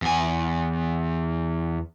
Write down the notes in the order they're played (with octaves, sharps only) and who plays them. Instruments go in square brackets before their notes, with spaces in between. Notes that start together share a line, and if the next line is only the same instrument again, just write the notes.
[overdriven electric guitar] E2 G#5